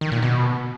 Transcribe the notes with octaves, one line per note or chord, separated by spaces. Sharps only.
D#3
A#2
B2